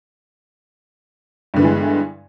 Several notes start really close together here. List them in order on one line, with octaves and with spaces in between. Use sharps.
G2 D3 B3 E3 G#3